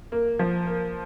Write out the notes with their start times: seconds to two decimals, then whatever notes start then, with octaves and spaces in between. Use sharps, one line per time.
0.12 A#3
0.39 F3
0.67 A#3